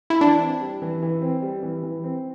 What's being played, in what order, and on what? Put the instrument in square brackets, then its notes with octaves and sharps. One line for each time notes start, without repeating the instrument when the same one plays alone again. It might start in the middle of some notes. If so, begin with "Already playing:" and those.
[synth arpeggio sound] E4
[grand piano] E3 [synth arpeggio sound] D4
[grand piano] C4
G3
E3
E3
C4
G3
E3
E3
C4